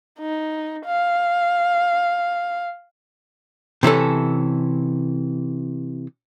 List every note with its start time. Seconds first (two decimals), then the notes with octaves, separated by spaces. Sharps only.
0.19 D#4
0.86 F5
3.83 C3 E3 C#4 A4